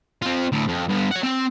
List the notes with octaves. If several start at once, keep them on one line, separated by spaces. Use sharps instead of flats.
C4 F4
D2 A2
F2
G2 B3
C#5 F#5
C4 G5